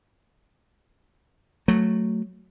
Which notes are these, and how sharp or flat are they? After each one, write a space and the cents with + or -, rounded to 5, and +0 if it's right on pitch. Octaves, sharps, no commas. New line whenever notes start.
F#3 -5 A3 +0